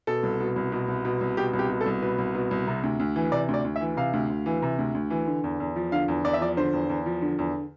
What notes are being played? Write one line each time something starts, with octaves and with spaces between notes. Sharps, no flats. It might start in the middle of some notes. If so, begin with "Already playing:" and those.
B2 A4
C2
B2
C2
B2
C2
B2
C2
B2 G4
C2
G4
B2
A4
C2
B2 B4
C2
B2
C2
C3
D2
D2
E3
C3 D5
D2
D5
D2
E5
E3
C3 F5
D2
D2
E3
C3
D2
D2
E3
D3
E2
E2
F3
D3 F5
E2
E2 D5
E5
F3 D5
D3 C5
E2
E2
F3
D3
E2